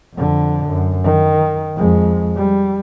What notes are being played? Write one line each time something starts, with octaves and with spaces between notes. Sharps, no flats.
F2 D3
F#2
D#3
F2 G#3
G3